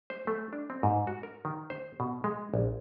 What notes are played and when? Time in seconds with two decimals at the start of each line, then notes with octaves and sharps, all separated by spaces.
0.10 C5
0.27 A3
0.53 D4
0.70 C4
0.83 G#2
1.07 F#4
1.23 A#4
1.45 D#3
1.70 C5
2.00 B2
2.24 G#3
2.54 A#1